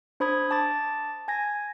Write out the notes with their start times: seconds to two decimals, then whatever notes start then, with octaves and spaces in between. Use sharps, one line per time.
0.20 D4 C5 B5 D#6 G#6
0.51 A5 D6 A6
1.28 G#5 G#6 A#6